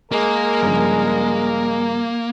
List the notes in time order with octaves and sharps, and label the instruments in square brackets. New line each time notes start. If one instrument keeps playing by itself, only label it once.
[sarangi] G#3 [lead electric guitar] A#3 [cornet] A#4
[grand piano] G2 C#3 F3